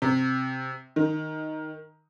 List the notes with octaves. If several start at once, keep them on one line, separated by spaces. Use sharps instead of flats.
C3
D#3